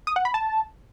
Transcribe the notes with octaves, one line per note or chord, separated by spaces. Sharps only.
D#6
F#5
B5
A5